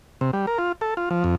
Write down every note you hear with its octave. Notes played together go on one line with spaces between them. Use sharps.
C3
G3
A#4
F4
A4
F4
F3
F2